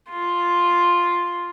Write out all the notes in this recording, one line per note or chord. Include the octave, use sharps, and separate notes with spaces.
F4